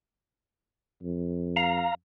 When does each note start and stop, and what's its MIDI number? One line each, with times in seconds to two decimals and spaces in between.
1.03 1.87 41
1.56 1.95 77
1.56 1.95 82